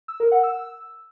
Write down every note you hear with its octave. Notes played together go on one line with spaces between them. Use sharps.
E6
A#4
F#5
E6